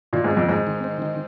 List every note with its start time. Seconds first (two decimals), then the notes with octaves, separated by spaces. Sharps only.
0.13 A#2 D#3
0.24 G#2
0.31 C4
0.37 F2
0.49 G#2 C4
0.67 D#3
0.84 C4
1.02 D#3